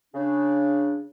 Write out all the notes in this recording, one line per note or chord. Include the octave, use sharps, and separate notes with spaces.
C#3 D4